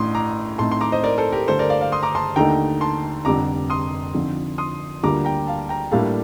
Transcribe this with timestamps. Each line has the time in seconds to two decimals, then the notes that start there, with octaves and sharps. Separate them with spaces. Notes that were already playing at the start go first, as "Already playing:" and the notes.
Already playing: A1 A2 A3 D4 C6 D#6
0.15 A#5 D6
0.58 A2 A3 C4 D#4 A5 C6
0.72 C6
0.81 A#5 D6
0.92 C5 D#5
1.03 A#4 D5
1.18 A4 C5
1.32 G4 A#4
1.48 G2 D3 A3 A4 C5
1.59 A#4 D5
1.70 D5 F5
1.81 D5 F5
1.92 C6 D#6
2.03 A#5 D6
2.15 A5 C6
2.36 D#2 D3 A3 D#4 A4 G5 A#5
2.81 A5 C6
3.25 F1 F2 D3 G3 C4 A#5 D6
3.70 C6 D#6
4.14 D3 F3 C4 D#4
4.58 C6 D#6
5.03 D2 D3 G3 A#3 F4 A#5 D6
5.25 G5 A#5
5.47 F5 A5
5.69 G5 A#5
5.91 A2 G3 A#3 D4 A4 F5 A5